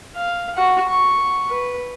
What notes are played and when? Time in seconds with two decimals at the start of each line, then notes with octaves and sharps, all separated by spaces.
0.16 F5
0.56 F#4 F#5
0.89 C#6
1.50 B4